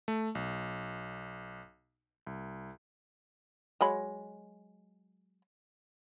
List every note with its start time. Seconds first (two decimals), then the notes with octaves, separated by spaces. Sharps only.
0.08 A3
0.35 B1
2.27 C2
3.81 F#3 G#3 B5